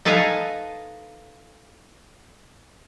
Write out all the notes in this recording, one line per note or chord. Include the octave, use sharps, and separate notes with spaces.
D#4 A4 B4 F5 G#5 A#5